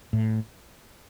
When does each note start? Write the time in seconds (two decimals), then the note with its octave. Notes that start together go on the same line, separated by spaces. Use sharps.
0.13 A2